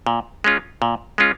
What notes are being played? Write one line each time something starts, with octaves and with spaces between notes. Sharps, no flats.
A#2
G#3 C#4 F4
A#2
G#3 C#4 F4